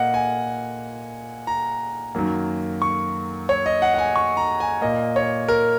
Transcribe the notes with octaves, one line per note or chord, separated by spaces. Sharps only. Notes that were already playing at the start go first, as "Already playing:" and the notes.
Already playing: A#2 A#3 D#5 F#5
G#5
A#5
F#2 D#3 F#3 A#3
C#6
C#5
D#5
F#5
F#5
G#5
C#6
A#5
G#5
A#2 A#3 D#5
C#5
A#4